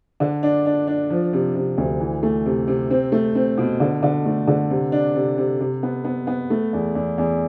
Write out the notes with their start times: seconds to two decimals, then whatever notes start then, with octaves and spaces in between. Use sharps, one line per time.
0.20 D3
0.43 D4
0.66 D4
0.88 D4
1.10 F3
1.33 C3
1.55 C3
1.78 D2
2.00 E3
2.23 A3
2.46 C3
2.68 C3
2.91 C4
3.12 A3
3.35 C4
3.58 B2
3.80 D3
4.03 D3
4.26 A3
4.47 D3
4.70 C3
4.92 D4
5.15 C3
5.38 C3
5.61 C3
5.83 B3
6.05 B3
6.27 B3
6.50 A3
6.73 E2
6.95 E2
7.18 E2